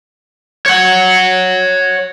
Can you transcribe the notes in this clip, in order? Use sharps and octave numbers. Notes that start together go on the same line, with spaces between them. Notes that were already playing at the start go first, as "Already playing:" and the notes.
C#5 F#5